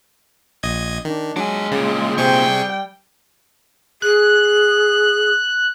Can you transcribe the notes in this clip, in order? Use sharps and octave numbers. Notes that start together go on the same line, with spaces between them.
A#1 D#5 G#6
D#3 D4
F#3 G#3 D4 G#5
G2 A#2 C#3
C3 C4 G#4 G5 C#6
G3
G#4 F#6